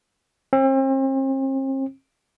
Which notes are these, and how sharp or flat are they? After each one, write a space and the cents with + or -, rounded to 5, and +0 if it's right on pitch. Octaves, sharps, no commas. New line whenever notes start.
C4 +40